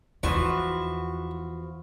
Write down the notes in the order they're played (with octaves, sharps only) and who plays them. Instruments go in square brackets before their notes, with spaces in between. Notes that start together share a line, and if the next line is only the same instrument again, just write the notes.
[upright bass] E2 [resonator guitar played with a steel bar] E3 F3 [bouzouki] F#4 [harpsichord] C#6